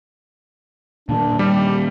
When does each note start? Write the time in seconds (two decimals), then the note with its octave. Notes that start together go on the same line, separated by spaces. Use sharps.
1.09 A#2 D#3 D4
1.39 G3 G4